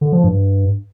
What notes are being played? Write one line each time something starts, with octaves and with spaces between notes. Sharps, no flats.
D3
F3
G2